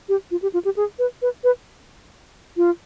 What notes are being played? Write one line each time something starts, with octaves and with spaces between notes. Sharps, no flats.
G4
F4
G4
F4
G4
G#4
B4
B4
B4
F4